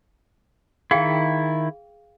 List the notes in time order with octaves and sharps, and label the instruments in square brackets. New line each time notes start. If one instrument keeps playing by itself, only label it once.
[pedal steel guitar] D#3 E4 [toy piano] G#4 F5 G5